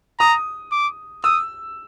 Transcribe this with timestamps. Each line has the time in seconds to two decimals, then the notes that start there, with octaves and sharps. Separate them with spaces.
0.19 A#5 D#6
0.72 D6
1.24 D#6 E6